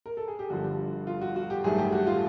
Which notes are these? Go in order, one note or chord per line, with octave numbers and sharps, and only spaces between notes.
A#4
A4
G#4
G4
G1 G2 D3 F3 F#4
F4
F#4
F#4
G4
A1 G2 D#3 F#3 A3 G#4
G4
F#4
F4